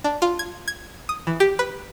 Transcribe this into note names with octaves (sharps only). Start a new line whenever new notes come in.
D4
F4
G#6
G#6
D#6
E3
G4
B4